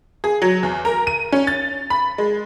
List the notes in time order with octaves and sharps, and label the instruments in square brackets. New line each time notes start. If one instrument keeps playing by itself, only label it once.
[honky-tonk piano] G#4
F#3
E2
A#4
D#7
C#4
A6
B5
G#3